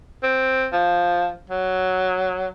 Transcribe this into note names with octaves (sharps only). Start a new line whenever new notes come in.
C4
F3
F#3